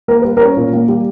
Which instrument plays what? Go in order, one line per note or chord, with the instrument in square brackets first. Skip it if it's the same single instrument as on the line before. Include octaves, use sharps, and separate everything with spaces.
[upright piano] A#3 A#4
G3 B4
C#4 A#4
A#2
A#3
G3